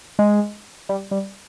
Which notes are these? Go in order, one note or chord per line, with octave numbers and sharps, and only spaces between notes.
G#3
G3
G3